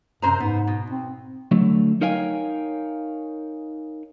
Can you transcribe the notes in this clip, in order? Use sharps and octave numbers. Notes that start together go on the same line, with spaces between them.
F#2 C3 C5 A#5
G#2 B3
B2
C4
D3 F#3 A3
D#4 A#4 C#5 F5 G5 G#5